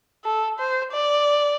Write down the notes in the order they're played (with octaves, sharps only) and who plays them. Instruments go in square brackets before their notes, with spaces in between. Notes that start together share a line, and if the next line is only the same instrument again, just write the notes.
[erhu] A4
C5
D5